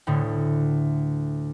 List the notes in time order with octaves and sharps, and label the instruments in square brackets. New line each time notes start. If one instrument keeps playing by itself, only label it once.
[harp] D2 A2 D3